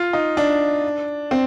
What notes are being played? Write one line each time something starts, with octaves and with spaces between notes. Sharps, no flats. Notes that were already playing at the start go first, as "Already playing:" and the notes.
Already playing: F4
D#4
D4
C4